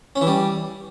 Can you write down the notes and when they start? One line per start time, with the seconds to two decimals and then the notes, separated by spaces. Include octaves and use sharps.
0.16 C#4
0.21 E3
0.27 G3